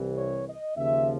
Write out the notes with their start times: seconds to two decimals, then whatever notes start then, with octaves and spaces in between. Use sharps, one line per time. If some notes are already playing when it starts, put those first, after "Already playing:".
Already playing: C2 C3 E3
0.17 C#5
0.48 D#5
0.77 D#2 C#3 F3 E5